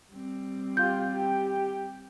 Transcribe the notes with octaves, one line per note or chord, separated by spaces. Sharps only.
G3 C4
F4 G4 G6
G4 G5